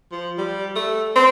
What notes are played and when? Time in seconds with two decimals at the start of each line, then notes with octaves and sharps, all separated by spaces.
0.12 F3
0.38 G3
0.76 A3
1.15 C4